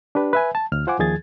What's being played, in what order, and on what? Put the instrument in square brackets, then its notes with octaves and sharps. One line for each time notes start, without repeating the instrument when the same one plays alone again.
[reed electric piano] D4 G4 B4
B4 E5 G#5
A5
D2 F6
F4 C5 F#5 G#5 D6
D#2 D#3 F3 G#4 G#6 A6